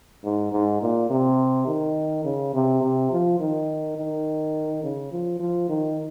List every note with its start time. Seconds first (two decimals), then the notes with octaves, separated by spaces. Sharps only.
0.24 G#2
0.52 G#2
0.81 A#2
1.10 C3
1.67 D#3
2.25 C#3
2.54 C3
2.82 C3
3.11 F3
3.39 D#3
3.97 D#3
4.83 C#3
5.12 F3
5.39 F3
5.69 D#3